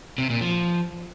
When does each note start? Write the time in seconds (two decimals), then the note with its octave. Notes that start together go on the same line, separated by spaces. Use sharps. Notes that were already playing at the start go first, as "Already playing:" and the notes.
0.18 C3
0.30 A#2
0.41 F3